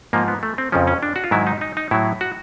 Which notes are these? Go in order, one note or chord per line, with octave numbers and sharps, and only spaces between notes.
G#2 F3 A#3
B3
A3
C4
F2 C#3 F3 C#4
C#4
D4
F#4
F4
G#2 D#3 F#3 E4
D#4
D#4
D#4
A2 F#3 E4
F#4